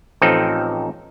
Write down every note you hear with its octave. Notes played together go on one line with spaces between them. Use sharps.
A1 F3 C4 D#4 A4